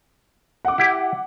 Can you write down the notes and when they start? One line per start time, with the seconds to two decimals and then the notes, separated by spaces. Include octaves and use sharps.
0.65 F#5 D6
0.78 E4 G4